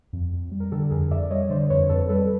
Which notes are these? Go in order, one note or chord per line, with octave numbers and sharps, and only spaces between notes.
F2
F2
G3
A#4
D3 G4 A4
F2 G#4 A#4
F2 D5 E5
G3 C#5 D#5
D3 C5 D5
F2 B4 C#5
F2 A4 B4
G3 A4 B4